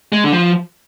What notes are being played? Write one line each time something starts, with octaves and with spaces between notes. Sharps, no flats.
G#3
D3
F3